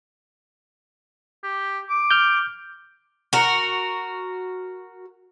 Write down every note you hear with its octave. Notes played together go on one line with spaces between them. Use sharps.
G4
D6
F6 G6
F#4 A#4